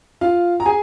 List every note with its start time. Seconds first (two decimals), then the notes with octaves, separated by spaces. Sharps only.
0.21 F4 F5
0.60 A#5
0.66 G#4 G#5